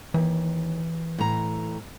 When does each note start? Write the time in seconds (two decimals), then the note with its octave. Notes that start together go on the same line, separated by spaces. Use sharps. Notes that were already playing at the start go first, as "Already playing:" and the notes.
0.14 D#2 E3
1.18 A2 A#5